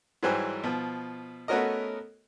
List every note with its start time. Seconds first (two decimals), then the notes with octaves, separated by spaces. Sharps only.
0.23 G#2 E3 F#3 G3 C5 G#5
0.64 B2 F3
1.48 A3 B3 C#4 F#4 A#4 D#5